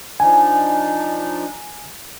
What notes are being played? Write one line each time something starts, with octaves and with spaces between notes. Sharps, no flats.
F3 D4 D#4 G#5